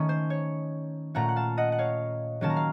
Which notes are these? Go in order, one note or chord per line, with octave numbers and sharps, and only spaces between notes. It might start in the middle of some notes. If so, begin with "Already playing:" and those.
Already playing: D#3 A3 C#4
C5
C#5
A#2 A3 C#4 F#5 A#5
F#5
F5 A5
D#5 F#5
F#5
C#5 F5
D#3 F#3 A#3 C#4 A5
A#5
F5